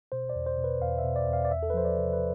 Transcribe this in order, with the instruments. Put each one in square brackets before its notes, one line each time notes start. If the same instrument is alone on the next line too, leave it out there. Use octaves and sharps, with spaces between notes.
[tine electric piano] B2 C5
D5
E2
C5
B2
B4
E2 F5
E5
B2
D5
E2
F5
D5
E2 E5
A4
B4
F3 C5
D5
C3
B4